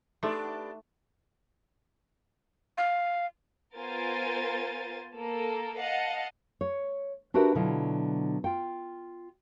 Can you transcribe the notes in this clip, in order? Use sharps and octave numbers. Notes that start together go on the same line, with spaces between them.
A3 B3 D4 D#4 G4 A4 C6
F5
B3 F4 A#4 C5 G#5 A6
A#3 A4 A#4
D#5 F5 F#5 A5
C#5
D4 F#4 G4 A#4 B4 E5
B2 D3 F#3 E4 F4
F4 G5